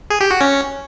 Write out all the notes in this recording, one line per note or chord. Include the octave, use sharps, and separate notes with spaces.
G#4
G4
F#4
C#4